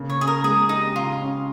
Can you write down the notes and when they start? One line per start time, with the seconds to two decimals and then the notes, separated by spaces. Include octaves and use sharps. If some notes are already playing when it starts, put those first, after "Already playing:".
Already playing: C#3 A#3
0.10 C#5
0.18 C#4 G#4
0.27 A#4
0.44 G#3 G#4
0.69 D#4 G4
0.95 C#3 F4
1.21 C#4